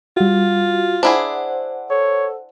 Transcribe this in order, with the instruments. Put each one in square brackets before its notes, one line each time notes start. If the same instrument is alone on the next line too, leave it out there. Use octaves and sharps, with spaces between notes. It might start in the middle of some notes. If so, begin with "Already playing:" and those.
[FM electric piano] G3 F#4 [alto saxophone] F4
[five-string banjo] D4 E4 G#4 [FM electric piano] C5 F#5
[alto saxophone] A4 [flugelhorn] C#5